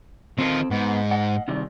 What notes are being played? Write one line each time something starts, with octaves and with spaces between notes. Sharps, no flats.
D#3 C4 F4 A4
G#2 B3
D#5 F#5
C3 D#3 G3